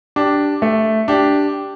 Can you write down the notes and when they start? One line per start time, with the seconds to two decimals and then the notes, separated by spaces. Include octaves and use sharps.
0.16 D4 G4
0.62 A3
1.08 D4 G4